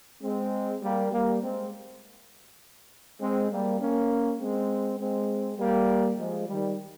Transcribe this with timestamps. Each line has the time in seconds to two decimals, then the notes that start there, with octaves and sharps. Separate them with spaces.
0.23 G#3 C4
0.83 G3 A#3
1.12 G3 A#3
1.42 G#3 C4
3.21 G#3 C4
3.51 G3 A#3
3.80 A#3 C#4
4.41 G#3 C4
5.00 G#3 C4
5.59 G3 A#3
6.18 F3 G#3
6.48 D#3 G3